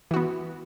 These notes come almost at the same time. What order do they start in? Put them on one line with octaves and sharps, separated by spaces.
E3 F#4 B3